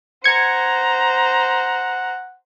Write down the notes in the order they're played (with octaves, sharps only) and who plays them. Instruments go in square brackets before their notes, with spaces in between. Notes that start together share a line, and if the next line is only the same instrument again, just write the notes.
[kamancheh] C5 A#5 [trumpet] F#5 [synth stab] G#6 C#7